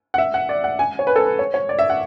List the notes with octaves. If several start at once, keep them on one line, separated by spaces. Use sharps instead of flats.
F#5
E5
F#5
D5
F#5
G#5
C#5
B4
A4
B4
C#5
C#5
D5
E5
F#5